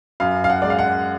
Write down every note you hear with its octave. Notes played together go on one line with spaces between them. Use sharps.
F#2 F5
F5
F#5
G#3 D5
F5
F#5